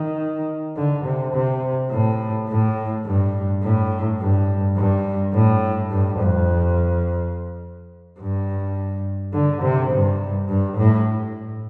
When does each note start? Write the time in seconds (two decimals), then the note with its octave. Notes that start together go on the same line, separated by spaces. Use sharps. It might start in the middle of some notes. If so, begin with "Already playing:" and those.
Already playing: D#3
0.76 D3
1.04 C3
1.33 C3
1.90 A2
2.48 A2
3.05 G2
3.62 A2
4.20 G2
4.76 G2
5.33 A2
5.90 G2
6.19 F2
8.19 G2
9.33 D3
9.62 C3
9.90 G2
10.48 G2
10.77 A2